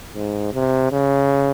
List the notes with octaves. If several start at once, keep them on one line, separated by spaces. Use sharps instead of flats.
G#2
C3
C#3